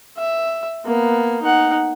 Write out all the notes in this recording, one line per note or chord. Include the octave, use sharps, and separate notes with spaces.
E5
A#3 B3
D#4 F#5